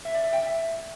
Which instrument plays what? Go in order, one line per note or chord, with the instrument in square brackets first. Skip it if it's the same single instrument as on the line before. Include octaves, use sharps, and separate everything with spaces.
[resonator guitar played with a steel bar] E5
D5
E5
G5
E5